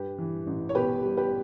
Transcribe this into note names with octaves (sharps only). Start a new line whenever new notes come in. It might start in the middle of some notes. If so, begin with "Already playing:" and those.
Already playing: G2 G4 B4
E3
A1
C#5
B2 G4 B4
G3
G4 B4